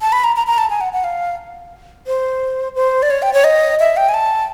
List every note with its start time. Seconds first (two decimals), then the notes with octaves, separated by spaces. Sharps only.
0.01 A5
0.12 B5
0.24 A#5
0.36 A#5
0.47 A#5
0.58 A5
0.70 G#5
0.81 F#5
0.93 F#5
1.04 F5
2.07 C5
2.75 C5
3.02 D5
3.10 C#5
3.22 G5
3.33 C#5
3.44 D#5
3.80 E5
3.97 G5
4.09 G#5
4.14 A5